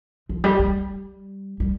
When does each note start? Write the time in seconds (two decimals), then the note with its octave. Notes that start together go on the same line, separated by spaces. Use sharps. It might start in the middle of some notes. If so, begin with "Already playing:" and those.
0.29 F3
0.44 G3
0.59 G3
1.60 G3